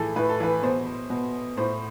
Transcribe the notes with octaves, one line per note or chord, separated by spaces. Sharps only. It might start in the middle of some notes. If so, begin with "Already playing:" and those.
Already playing: A2 E3 G#4 A4
A2 B4
A4
E3 B4
B2 C5
B2
A2 C5